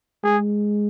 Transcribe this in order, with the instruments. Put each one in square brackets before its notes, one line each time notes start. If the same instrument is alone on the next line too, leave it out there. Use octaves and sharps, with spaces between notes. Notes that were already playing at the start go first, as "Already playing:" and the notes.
[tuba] G#3 [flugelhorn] G#4